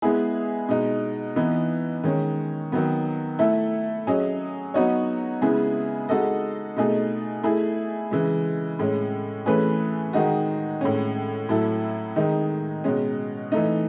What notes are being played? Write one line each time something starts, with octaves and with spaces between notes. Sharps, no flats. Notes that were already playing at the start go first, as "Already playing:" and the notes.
G#3 B3 E4 G#4
B2 G#3 D#4
E3 B3 D#4
D#3 G#3 C#4
D#3 F#3 B3
A3 E4 A4 E5
F#3 C#4 G#4 D#5
F#3 B3 D#4 F#4 C#5
C#3 G#3 B3 E4 G#4
G#3 D#4 F#4 A4 D#5
B2 A3 D#4 G#4
A3 E4 G#4
C#3 E3 G#3
A2 G#3 C#4
E3 A3 C#4 G#4 B4
D#3 G#3 D#4 F#4
A2 G#3 C#4
A2 F#3 A3 E4 A4
D#3 G#3 D#4
B2 G#3 C#4
E3 A3 D#4